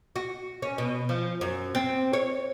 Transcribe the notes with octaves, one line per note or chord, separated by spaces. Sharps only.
F#4
C#4
B2
F3
F#2
C4
C#5